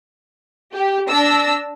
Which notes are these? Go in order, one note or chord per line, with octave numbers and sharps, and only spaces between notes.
G4
D4 E6 A#6